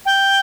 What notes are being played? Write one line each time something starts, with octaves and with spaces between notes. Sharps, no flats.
G5